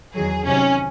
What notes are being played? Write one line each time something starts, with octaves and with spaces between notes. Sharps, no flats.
E2 D#3 F#3 G#4
E2 C3 D#3 F#3 C#4